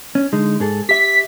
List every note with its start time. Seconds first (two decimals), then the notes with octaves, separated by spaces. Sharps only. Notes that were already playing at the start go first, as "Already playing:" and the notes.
0.15 C#4
0.33 D3 G#3 D#4
0.60 G#2 G#4 A4
0.89 G4 E5 B6